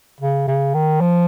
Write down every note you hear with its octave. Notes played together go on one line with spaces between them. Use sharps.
C#3
C#3
D#3
F3